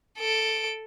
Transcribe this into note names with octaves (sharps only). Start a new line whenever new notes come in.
A4 D7